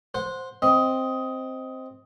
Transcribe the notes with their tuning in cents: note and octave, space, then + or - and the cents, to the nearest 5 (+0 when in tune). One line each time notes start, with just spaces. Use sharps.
C5 +0 F#5 -20
C4 +0 D#5 +15